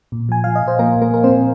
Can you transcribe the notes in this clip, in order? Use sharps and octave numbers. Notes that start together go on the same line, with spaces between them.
A#2
F3 G#5
F3 F5
D#5
A#2
C5
F3 A#3 A#4
A#2
A#3 A#4
F3 A#4
C4 C5
A#2